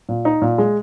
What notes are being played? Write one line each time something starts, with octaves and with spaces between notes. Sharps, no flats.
A#2
D#4
A#2
G#3